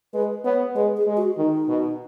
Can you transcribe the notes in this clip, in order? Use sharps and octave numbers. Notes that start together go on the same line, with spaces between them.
G#3 B4
B3 C#5
G#3 B4
G#4
G#3
F#4
D#3 D#4
B2